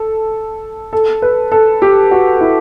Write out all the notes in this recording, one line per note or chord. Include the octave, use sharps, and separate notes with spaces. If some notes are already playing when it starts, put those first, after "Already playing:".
Already playing: A4
A4
B4
A4
G4
F#4
E4